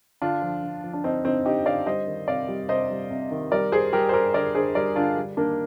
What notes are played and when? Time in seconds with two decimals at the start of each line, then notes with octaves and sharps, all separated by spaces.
0.22 D3 D4 F4
0.42 F3
0.63 D3
0.84 F3
0.93 D4
1.04 D3 C4 D#4
1.25 D3 C4 D#4
1.46 D3 D#4 G4
1.66 D3 D5 F5
1.86 G3 C5 D#5
2.07 D#3
2.28 C3 D5 F5
2.48 G3
2.69 C3 C5 D#5
2.90 G3
3.10 C3
3.31 D#3
3.51 G3 A#4 D5
3.72 G3 G#4 C5
3.93 G3 G4 A#4
4.09 C5
4.13 G3 G4 A#4
4.34 D3 A#4 D5
4.55 D3 G#4 C5
4.75 G3 A#4 D5
4.96 D3 D4 F4
5.17 G3
5.37 D#3 A#3 D4